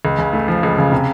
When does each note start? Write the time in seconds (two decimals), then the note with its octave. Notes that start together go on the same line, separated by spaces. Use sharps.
0.05 C#2
0.18 C#3
0.33 A3
0.48 F3
0.63 C#2
0.78 C#3
0.92 C3